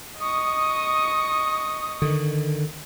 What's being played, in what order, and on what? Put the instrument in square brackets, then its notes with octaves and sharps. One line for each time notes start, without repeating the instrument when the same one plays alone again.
[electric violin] D#5 C#6 [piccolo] D#6
[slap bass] D3 D#3